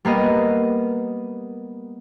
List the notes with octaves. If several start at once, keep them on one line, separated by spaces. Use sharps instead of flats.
G3 A#3 B3 D#5